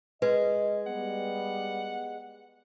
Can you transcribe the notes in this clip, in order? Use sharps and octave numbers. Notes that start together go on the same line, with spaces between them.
G#3 B4 D#5
G3 B3 F#5